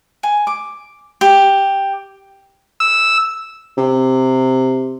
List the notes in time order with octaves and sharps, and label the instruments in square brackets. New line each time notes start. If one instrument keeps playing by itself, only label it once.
[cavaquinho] G#5
D6
G4
[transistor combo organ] E6
[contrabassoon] C3